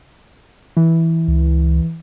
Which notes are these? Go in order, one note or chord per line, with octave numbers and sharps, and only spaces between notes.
E3
C#2